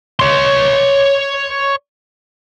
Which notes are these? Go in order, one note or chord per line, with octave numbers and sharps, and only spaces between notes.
C#5 C6